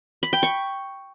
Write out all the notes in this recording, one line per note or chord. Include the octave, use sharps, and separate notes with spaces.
B5
G5
C#6